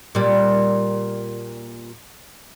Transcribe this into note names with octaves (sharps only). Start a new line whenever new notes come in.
A#2 G3